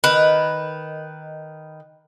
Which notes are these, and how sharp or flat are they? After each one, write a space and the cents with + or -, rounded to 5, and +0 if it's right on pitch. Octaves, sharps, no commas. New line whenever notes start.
D#3 +0 B4 +0